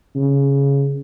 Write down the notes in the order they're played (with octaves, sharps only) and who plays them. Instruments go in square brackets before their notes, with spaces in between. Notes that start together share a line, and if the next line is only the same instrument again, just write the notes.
[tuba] C#3